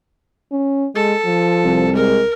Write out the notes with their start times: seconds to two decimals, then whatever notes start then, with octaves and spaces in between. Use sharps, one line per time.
0.52 C#4
0.95 G#3 A4
1.25 F3
1.64 C2
1.95 G#3 A#4